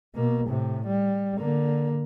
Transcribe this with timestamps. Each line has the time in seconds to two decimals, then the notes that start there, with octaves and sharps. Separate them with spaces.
0.15 B2 A#3
0.47 A2 C3
0.86 G3
1.39 D3 A#3